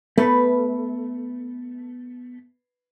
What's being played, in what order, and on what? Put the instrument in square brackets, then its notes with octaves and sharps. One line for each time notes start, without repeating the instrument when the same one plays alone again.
[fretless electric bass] A3 [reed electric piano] B3 [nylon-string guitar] B4